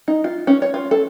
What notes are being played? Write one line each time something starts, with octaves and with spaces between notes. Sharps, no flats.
D#4
F4
C#4
C#5
F4
A4